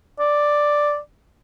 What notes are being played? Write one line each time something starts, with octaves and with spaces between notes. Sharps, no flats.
D5